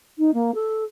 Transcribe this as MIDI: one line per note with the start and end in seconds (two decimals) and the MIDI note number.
0.18 0.30 63
0.34 0.51 58
0.54 0.84 69